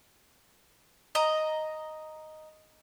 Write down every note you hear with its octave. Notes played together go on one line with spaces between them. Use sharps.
D#5 A#5